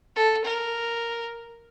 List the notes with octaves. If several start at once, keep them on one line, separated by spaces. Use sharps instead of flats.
A4
A#4